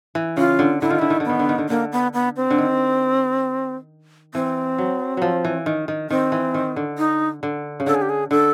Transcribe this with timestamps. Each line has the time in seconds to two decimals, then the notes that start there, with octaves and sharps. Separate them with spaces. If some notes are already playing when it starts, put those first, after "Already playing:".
0.15 E3
0.37 C#3 F4
0.59 D3
0.81 D3 E4
0.90 D#3 F4
0.99 D3 E4
1.10 D#3
1.20 D3
1.25 D#3 B3
1.39 D3
1.49 D#3
1.58 D3
1.69 D3 A#3
1.92 B3
2.14 B3
2.36 C4
2.50 D3
2.58 D#3
4.34 E3 C4
4.78 F#3
5.17 F3 F#3
5.45 E3
5.66 D#3
5.88 D#3
6.10 D#3 C4
6.32 E3
6.54 D#3
6.76 D3
6.98 D#4
7.43 D3
7.80 C#3
7.86 D3 A4
7.95 G#4
8.02 G4
8.09 G#4
8.31 D3 A4